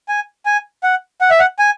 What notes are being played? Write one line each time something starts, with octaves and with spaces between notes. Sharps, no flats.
G#5
G#5
F#5
F#5
E5
F#5
G#5